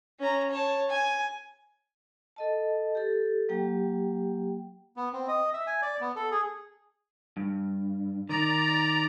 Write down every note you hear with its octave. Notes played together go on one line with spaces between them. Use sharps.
C#4 A#5
C#5 A5
G#5
A4 D#5 A5
G4 A4
F#3 A#3 G4 G5
B3
C4
D#5
E5
G#5
D5
B3
A4
G#4
G2
D#3 D5 A#5